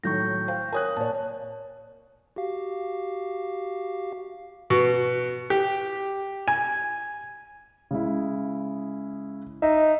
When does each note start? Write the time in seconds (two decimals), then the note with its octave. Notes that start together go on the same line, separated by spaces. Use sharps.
0.04 A2 D#3 F#3 C#6 G6 A#6
0.48 C5 F5 G5
0.73 A#4 C#5 G#5 D#6 F#6
0.97 A#2 C#5 A5
2.36 F#4 G4 F5
4.70 B2
5.50 G4
6.48 G#5
7.91 C#3 G#3 E4
9.62 D#4 E5